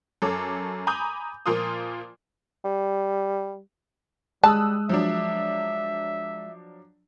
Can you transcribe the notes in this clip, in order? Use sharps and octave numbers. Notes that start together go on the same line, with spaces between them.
F#2 A4 C#5 D6
G#5 A#5 B5 D6 D#6 G6
A#2 F3 A#3 F4 C6 D#6
G3
G3 G#3 A5 D#6 E6 F#6
F3 F#3 D4 E5